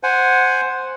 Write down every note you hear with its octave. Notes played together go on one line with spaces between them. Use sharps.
C5 F#5 G#5